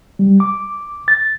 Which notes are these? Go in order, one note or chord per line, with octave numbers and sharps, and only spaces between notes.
G3
D6
A6